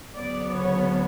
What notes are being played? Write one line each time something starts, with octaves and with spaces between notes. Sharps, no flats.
D2 C#3 F#3 B3 D5
C#5